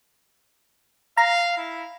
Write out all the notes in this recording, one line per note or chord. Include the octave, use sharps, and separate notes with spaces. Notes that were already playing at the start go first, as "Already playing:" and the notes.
F5 A#5
E4